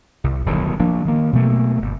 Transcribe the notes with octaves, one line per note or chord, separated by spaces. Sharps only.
C2
D1 B1 G2 D#3
F3 A#3 D4
D#3 A#3
B2 F#3 A3 A#3
G1